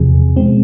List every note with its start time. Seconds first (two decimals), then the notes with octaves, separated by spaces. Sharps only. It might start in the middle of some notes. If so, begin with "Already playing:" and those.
Already playing: E2 C3 F3 G#4
0.36 B2 G#3 C4